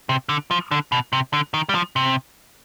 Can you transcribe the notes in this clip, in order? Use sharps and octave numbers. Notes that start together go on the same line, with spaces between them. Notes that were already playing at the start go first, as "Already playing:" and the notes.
C3
D3
F3
D3
B2
C3
D3
D#3
G3
F3
C3